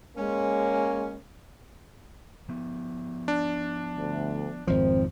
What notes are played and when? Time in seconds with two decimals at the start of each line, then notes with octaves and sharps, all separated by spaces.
0.17 G#3 A#3 C#4
2.49 F3 B3
3.28 D4
3.96 D2
4.67 G#1 F2 F3 C4